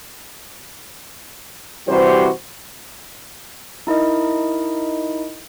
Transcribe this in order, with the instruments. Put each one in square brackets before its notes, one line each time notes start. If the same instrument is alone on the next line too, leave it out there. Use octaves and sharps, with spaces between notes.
[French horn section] C3 E3 G3 F#4 C5
[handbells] D#4 E4 A#4 D#5